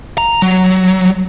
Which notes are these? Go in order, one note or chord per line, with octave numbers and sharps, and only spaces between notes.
A#5
F#3